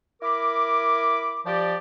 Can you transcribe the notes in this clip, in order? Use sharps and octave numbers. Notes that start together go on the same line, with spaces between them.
E4 A#4 B5 D6
F3 G4 D5